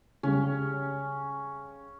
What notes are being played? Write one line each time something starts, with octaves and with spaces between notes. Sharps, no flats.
C#3 G3 C#4